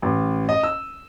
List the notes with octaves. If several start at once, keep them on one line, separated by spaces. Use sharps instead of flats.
A1
D#5
E6